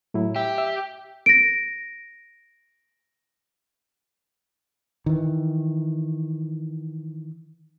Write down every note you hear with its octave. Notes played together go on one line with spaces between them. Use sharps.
A2 F#3 E4
G4 E5
E5
A#6 D7
D#3 E3